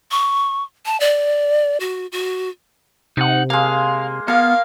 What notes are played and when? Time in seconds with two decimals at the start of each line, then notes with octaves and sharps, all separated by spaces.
0.11 C#6
0.86 A5
1.00 D5
1.80 F#4
2.12 F#4
3.17 C3 D#4 F#5
3.50 G#3 A#3 F5
4.28 A#3 B3 A#4 F5